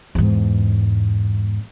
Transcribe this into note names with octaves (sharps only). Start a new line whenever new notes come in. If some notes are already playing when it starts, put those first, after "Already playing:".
E2 G#2